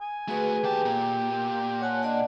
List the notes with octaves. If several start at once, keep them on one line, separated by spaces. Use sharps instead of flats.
G#5
A3 F#4 G#4 B4
D#2 G4 A5
A#2 A#5
C#5 F#5 G#5 A5
D4 D5 D#5 F#5